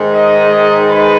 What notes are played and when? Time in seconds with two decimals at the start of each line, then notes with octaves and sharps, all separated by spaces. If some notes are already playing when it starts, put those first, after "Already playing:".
Already playing: G#2 D#3 G#3 D#4
0.12 D#5
0.87 B4